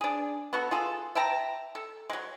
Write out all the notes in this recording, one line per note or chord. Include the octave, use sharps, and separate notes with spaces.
D4 G#4
B3 F#4 A4
F4 G#4 A4
E5 G5 A5 A#5
A4
F#3 G#3